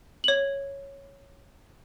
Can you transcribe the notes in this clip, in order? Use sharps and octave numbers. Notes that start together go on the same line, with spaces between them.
C#5 F#7